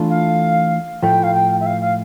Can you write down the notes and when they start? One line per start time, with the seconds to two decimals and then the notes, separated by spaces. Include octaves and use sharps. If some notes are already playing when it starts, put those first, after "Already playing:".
Already playing: E3 A3 D4 F4 A4
0.09 F5
1.03 A2 F3 A3 G5
1.23 F5
1.34 G5
1.60 E5
1.66 F5
1.82 F5